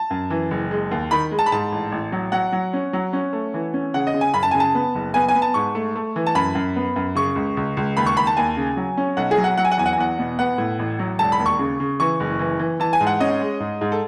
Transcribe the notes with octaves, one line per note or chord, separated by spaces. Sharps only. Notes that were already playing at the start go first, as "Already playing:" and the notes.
Already playing: A5
F#2
E3
F#1
G#3
D#2
D#3 B5
G#3
A5
B5
G#2 A5
A1
A1
F#3
F#3 F#5
F#3
C#4
F#3
C#4
A3
E3
C#4
C#3 F#5
D#5
C#3
G#5
F#2 B5
A5
C#3 G#5
A5
B3
F#1
B3 G#5
G#5
B3
A5
G#2 C#6
A3
A3
E3
A5
F#2 B5
F#2
B3
F#2
C#3 C#6
C#2
C#2
C#2
D#2 B5
C#6
D#2 B5
A5
D#2 G#5
C#3
F#3
C#4
B1 F#5
G#4
F#3
F#5
F#3 F#5
G#5
F#5
E2 G#5
F#5
G#5
E2 F#5
B2
B3 F#5
A2
A1
F#3
E1 A5
B5
D#2
C#6
C#3
C#3
E3 C#6
F#1
E3
E3
E3 A5
G#5
G#2
F#5
C#4 D#5
G#3
G#2
G#2
A4